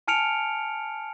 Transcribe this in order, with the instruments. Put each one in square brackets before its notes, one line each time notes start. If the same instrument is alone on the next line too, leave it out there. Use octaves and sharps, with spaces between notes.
[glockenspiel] G#5 A5 F6 C#7 D7 F7